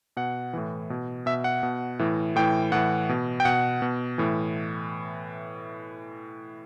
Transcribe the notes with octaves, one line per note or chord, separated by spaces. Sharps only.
B2 F#5
A2 E3
B2
B2 E5
F#5
B2
A2 E3
A2 E3 G5
A2 E3 F#5
B2
G5
B2 F#5
B2
A2 E3